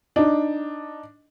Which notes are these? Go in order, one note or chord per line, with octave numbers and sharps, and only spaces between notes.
D4 D#4